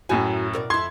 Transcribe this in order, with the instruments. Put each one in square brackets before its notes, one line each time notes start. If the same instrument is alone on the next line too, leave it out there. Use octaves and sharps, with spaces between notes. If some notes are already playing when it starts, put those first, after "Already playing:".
[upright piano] F#2 A2 G#5 [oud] E4 F#4
[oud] B2 A#4 D5
[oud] F2 E4 [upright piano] C6 G#6